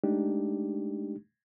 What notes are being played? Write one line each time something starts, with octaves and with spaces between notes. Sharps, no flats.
G#3 A3 D4 D#4 G4